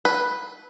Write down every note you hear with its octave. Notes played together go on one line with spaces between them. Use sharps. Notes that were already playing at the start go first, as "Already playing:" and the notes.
B4